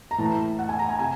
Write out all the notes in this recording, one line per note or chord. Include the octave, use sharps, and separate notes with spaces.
A#5
A2 E3 A5
F#5
G#5
A#5
G#5
C3 G#5